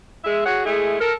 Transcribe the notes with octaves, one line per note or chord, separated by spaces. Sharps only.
G#3 E5
F#4 G#4 C#5 F#5
G#3 A3 E4 G#4
A4 A#4